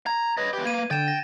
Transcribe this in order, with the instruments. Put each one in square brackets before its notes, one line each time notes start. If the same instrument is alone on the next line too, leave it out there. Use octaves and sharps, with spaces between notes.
[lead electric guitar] A#5 [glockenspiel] G#6
[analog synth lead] B4 [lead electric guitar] C#5 D#5
[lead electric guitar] E2 G4 [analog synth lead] B4
[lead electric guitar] A#3 [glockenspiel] G#6 D#7
[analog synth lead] D3 [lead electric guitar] G5 [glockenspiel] A6 E7
[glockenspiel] A#6